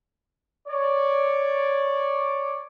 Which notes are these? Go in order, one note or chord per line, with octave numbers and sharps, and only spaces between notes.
C#5 D5